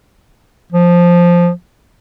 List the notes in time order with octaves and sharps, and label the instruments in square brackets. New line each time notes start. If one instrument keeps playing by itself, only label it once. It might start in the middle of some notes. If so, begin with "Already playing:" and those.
[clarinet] F3